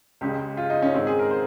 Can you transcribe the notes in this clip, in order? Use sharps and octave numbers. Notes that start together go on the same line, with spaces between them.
C#2 C#3 G#3 G4
F4
D#4
C#4
G#2 D#3 G#3 C4
G#4
A#4
C5